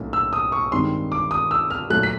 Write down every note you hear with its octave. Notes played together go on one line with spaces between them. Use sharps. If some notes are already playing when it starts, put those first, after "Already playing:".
Already playing: B1 A2 F#3 A#3 C#4
E6
D#6
C#6
G2 D#3 G#3 C4 C6
D6
D#6
E6
F6
A#2 F#3 A3 F#6
B6